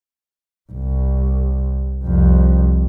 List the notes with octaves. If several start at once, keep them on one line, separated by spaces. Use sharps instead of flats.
C2
C2 F2